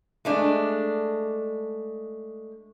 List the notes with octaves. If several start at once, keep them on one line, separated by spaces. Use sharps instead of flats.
G#3 A3 D4